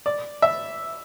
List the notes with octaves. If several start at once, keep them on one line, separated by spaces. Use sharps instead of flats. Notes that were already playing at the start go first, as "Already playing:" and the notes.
D5
E5